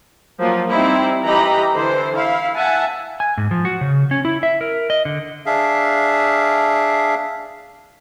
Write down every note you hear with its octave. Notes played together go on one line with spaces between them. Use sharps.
F3 F#3 A#3
G3 C4 D#4 E4 C5
E3 G4 D#5 A#5 B5
D3 E3 C5
E4 F5
E5 F#5 G#5 A5
G#5
G#2
F3
F#4
C#3
C#4
E4
E5
A#4
D#5
D3
D4 G#4 E5 F5